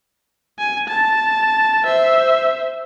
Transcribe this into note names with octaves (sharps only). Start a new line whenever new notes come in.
G#5
A5
C5 E5